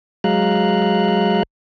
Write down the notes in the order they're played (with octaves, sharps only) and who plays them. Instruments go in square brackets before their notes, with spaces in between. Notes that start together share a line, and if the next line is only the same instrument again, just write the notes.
[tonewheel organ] F#3 G#3 F5 A#5 F#6